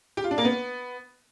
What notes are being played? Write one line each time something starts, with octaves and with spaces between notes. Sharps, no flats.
G4
F4
D4
A#3
B3